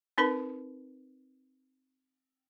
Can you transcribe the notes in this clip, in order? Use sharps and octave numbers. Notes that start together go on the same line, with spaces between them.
C4 D#4 A#4 B4 B5